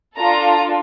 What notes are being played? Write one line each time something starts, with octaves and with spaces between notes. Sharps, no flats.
D4 F4 A4 A#5